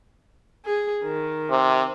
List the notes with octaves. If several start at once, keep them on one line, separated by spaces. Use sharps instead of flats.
G#4
D#3
C3